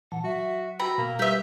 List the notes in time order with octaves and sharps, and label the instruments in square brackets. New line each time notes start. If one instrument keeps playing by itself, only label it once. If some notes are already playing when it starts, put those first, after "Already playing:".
[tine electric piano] A#2 E3 A5 [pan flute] F#5
[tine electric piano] F#3 [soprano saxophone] F#4 [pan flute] E5
[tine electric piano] F#4 G5 [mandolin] A#5 [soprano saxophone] B5 [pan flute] E6
[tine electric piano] B2 [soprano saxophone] A#3
[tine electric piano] G3 [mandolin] G4 E5 [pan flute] B4